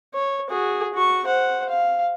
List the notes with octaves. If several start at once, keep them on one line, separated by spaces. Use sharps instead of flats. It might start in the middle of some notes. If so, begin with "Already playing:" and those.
C#5
F#4 G#4
F#4 C#6
C5 F#5
F5